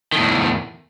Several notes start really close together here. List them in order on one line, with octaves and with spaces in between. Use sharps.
D#3 A2 E2